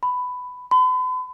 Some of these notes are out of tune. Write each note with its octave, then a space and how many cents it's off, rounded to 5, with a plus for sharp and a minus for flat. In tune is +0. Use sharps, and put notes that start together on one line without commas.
B5 +15
B5 +40